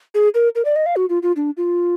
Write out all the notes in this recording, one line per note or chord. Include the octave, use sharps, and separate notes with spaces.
G#4
A#4
A#4
D5
D#5
F5
F#4
F4
F4
D4
F4